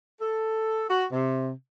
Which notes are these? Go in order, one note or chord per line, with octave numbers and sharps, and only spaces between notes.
A4
F#4
C3